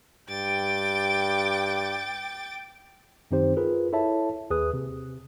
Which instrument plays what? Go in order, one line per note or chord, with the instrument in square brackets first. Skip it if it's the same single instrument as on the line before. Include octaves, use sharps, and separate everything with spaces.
[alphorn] G2 [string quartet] G5 D6 A6
[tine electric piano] F#2 D#3 C4 D#4 G4 C5
F4 G#4 A#4 B4
E4 A4 C#5 E5 A5
D#2 G#4 B4 D#6 F#6
C3